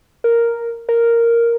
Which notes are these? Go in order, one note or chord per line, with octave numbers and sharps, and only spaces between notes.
A#4
A#4